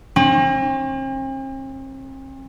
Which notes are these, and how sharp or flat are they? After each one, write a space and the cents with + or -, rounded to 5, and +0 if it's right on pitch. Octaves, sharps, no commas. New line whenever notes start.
C4 +45